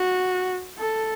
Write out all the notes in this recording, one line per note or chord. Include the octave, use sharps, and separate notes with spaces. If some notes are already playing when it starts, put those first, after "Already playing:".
Already playing: F#4
A4